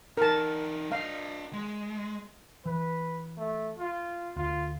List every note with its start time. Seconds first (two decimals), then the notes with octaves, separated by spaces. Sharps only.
0.17 E3 D#4 A#4 A5
0.92 D4 D#5 F5
1.53 G#3
2.66 E3 B4
3.37 A3
3.79 F4
4.37 D2 F4